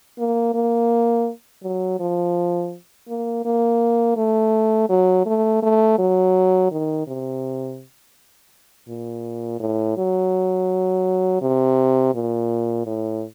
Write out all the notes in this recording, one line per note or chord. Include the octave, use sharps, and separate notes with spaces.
A#3
A#3
F#3
F3
A#3
A#3
A3
F#3
A3
A3
F#3
D#3
C3
A#2
A2
F#3
C3
A#2
A2